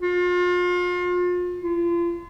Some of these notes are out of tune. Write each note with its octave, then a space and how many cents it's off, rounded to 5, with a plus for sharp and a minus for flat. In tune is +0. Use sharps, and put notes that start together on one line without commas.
F4 +35
F4 -35